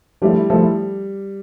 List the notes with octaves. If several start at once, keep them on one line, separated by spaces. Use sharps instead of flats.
F3 G3 A3 E4 A4
F3 A3 E4 A4